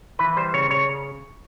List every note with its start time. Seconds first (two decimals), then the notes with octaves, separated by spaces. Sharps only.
0.19 E3 B4
0.37 G3 C5
0.54 C#3 C#5
0.71 C#3 C#5